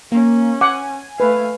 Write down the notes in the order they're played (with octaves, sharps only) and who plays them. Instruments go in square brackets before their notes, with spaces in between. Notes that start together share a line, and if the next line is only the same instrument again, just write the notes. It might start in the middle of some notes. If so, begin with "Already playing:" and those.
[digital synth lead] A#3 [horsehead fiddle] C#4
[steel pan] F#5 [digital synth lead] G#5 [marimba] D6
[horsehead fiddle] A3 F5 [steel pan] B4